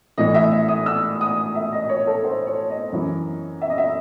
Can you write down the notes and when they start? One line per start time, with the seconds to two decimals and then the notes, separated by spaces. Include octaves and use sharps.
0.18 A2 E3 D#5
0.34 E5
0.52 E5
0.68 D#6
0.86 E6
1.21 D#6
1.55 E5
1.72 D#5
1.89 C#5
2.07 A4
2.24 C5
2.47 C#5
2.70 D#5
2.92 F#2 E3
3.62 E5
3.70 D#5
3.78 E5